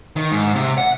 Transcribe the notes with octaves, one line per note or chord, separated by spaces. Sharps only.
D#3
G#2
C3
F#5